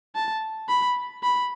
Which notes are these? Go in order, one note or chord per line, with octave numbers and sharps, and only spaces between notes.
A5
B5
B5